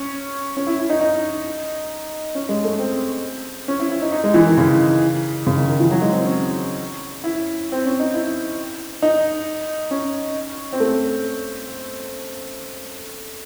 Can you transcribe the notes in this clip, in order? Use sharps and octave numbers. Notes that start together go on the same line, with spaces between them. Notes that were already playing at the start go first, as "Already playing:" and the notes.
Already playing: C#4
C#4
E4
E4
D#4
D#4
C#4
G#3
A3
C4
C#4
E4
E4
D#4
D#4
G#3
E3
D#3
C#3
C#3
D#3
D#3
E3
F#3
G#3
C4
C#4
E4
C4
C#4
D#4
E4
D#4
C#4
C4
A3